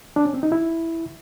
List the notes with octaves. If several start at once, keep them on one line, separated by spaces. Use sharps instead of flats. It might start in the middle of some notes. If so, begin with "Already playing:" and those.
D4
C#4
C4
D#4
E4